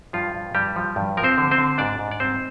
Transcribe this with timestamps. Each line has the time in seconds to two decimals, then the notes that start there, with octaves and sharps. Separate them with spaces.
0.13 G2 F3 F4
0.35 G2
0.55 G2 G3 G4
0.76 F3
0.96 G2
1.17 F3 A#4
1.23 C4 C5
1.38 D3
1.51 C4 C5
1.58 D3
1.78 G#2 D4 D5
1.99 G#2
2.11 D5
2.20 G3 C4 C5